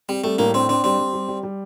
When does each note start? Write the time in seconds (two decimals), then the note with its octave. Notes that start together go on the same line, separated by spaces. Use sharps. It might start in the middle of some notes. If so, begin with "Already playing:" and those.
0.09 G3 C4
0.24 G3 A3
0.39 A2 A#3
0.54 C4 D4
0.69 C4 D4
0.84 G3 C4
0.99 G3
1.13 G3
1.28 G3
1.43 G3